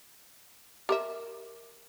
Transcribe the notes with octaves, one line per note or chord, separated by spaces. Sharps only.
G4 A#4 E5